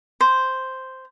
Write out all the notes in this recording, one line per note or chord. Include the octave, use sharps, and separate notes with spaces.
C5